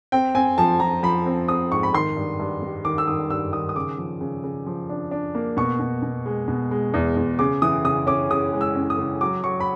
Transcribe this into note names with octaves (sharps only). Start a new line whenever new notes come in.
C4 G5
C4 G#5
F3 A5
F3 A#5
F3 B5
C4
C4 D#6
G#2 C#6
B5
D#3 C6
G2
G2
G3
D#3 D6
E6
D#3 D#6
G2 E6
D#3 D#6
D#6
C#3 D6
F3
C#3
C#3
F3
D4
D4
A#3
B2 C#6
B2
B2
G#3
B2
G#3
E2
E2
C#3 D6
E3 D#6
C#3 D#6
C#4 D6
C#3 D#6
G#3
E6
C#4
D#6
C#3
F#3 D6
F#3 C#6
B5